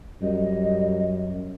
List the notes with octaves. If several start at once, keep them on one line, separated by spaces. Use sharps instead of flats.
F#2 G3 D#5